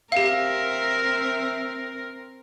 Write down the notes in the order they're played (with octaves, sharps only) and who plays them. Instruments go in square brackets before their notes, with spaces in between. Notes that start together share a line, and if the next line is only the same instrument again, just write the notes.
[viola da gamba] C4 A#4 [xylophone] G4 F5 [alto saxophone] E5